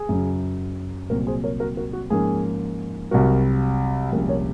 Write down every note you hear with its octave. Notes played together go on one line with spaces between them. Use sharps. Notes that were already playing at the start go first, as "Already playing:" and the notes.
Already playing: G#4
F#2 C#3 F#3
C2 A#2 F#3 C4 F#4 A#4
G#4 C5
A#4 C#5
F#4 A#4
F#4 A#4
F#4
G#2 F3 A#3 C#4 G#4
C2 C3 F#3 F#4 A#4
C2 A#2 F3 G#3 C#4 F#4 A#4
A#4 C#5